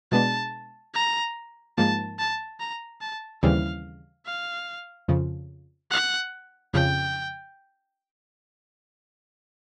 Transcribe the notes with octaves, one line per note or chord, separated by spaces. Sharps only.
B2 G#3 B3 D4 A5
A#5
G#2 F3 A#3 A5
A5
A#5
A5
D#2 C#3 E3 G3 C4 F5
F5
F2 C#3 F3
F#5
F2 C#3 F3 G5